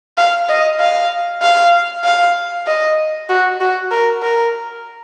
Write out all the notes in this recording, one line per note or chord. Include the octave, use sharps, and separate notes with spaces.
F5
D#5
F5
F5
F5
D#5
F#4
F#4
A#4
A#4